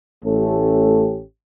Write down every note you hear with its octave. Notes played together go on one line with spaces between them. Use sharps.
A1 A3 C#4 G4 A4